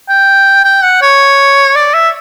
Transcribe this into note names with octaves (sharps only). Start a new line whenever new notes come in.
G5
G5
F#5
C#5
D5
E5